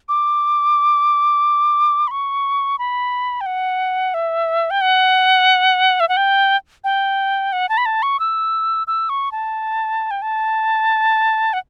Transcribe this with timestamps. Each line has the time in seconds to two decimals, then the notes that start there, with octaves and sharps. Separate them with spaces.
0.09 D6
2.07 B5
2.11 C#6
2.79 B5
3.41 G5
3.46 F#5
4.14 E5
4.71 G5
4.81 F#5
6.00 E5
6.09 F#5
6.17 G5
6.84 G5
7.52 F#5
7.69 A5
7.78 B5
7.86 A5
8.03 C#6
8.20 E6
8.87 E6
9.09 C#6
9.32 A5
10.11 G5
10.22 A5
11.53 F#5